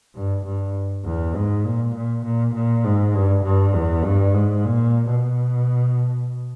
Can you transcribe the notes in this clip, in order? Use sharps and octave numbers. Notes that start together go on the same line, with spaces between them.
G2
G2
E2
G#2
A#2
A#2
A#2
A#2
G#2
G2
G2
E2
G2
G#2
A#2
B2